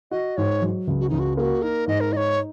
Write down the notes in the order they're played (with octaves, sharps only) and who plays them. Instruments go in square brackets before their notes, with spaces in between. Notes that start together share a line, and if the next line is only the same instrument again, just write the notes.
[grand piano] F#4 [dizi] D#5
[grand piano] G#2 [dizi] C#5
[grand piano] F#3
C#2
[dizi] F#4
[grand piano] C#2 [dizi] D#4
[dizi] F#4
[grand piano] A#3 [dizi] G#4
[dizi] F#4
[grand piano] D#4 [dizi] A#4
[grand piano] G#2 [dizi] D#5
[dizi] A#4
[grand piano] D#4 [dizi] D#5
[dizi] C#5